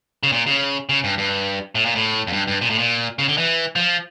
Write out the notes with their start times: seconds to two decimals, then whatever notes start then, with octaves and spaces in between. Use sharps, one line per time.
0.23 C#3
0.32 A#2
0.46 C#3
0.89 C#3
1.04 G2
1.18 G2
1.75 A2
1.86 A#2
1.95 A2
2.27 F2
2.33 G2
2.47 G2
2.61 A#2
2.70 A2
2.79 A#2
3.19 C#3
3.28 D3
3.38 E3
3.76 F3